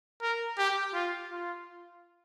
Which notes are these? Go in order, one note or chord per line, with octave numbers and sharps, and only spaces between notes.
A#4
G4
F4
F4